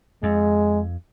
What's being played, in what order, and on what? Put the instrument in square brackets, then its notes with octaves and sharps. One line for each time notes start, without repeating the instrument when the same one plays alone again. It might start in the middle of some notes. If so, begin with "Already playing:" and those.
[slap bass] F2 [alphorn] G#3